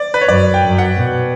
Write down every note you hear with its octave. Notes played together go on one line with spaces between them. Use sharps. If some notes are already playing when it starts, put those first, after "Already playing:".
Already playing: D5
B4
C#5
F#2 D5
G5
F#2
F#5
B2